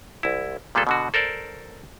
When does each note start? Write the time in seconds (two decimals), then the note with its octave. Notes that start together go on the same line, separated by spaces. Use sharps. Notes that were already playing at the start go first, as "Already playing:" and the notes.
0.23 C2 E4
0.75 A#2 G3 B3 G#4 A4
0.87 B2 D3 F#4
1.14 A4 A#4 C5 D5